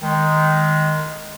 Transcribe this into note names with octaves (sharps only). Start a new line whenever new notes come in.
D#3 G#3